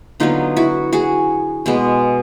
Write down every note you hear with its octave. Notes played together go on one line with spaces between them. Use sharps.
D3 F#3 B3 D#4 F4
E4 F#4
F#4 G#4
B2 G#3 B3